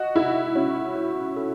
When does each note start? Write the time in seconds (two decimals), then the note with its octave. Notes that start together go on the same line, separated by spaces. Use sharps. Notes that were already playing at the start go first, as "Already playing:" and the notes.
Already playing: F#4 D#5
0.15 D#4 E4
0.55 C#4 F#4
0.96 F#4
1.37 A4